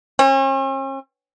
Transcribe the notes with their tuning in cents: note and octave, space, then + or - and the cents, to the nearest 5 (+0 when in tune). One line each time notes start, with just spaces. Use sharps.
C#4 -45